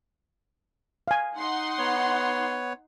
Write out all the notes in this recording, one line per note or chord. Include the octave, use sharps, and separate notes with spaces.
F5 G#5
D#4 F#5 C6
B3 C#5